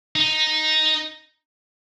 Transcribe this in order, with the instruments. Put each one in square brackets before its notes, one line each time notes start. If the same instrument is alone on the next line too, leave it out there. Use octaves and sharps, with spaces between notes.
[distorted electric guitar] D#4